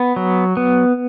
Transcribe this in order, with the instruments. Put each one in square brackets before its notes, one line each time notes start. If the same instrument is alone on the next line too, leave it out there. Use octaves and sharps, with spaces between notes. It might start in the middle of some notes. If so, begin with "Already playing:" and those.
Already playing: [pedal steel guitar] B3
F#3
B3